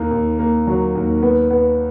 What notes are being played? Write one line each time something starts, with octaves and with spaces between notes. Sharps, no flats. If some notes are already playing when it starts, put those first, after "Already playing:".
Already playing: D#2 A#3
D#2
A#3
F#3
D#2
B3
B3